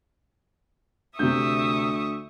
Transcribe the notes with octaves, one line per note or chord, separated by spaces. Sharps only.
D2 C3 E5 C#6 D#6 G6